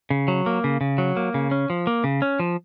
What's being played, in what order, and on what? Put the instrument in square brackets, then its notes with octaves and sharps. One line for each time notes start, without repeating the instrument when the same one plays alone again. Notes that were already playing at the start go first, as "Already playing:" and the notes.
[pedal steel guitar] C#3
F#3
A#3
C#3
C#3
F#3
A#3
C#3
C#4
F3
A#3
C#3
C#4
F3